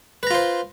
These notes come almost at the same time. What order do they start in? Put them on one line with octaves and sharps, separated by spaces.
B4 A#5 F4 C5